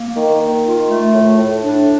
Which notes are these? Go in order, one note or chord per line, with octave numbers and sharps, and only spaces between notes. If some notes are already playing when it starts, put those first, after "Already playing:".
Already playing: A#3
D#3
D#3
F4
A3
A2
A2
D4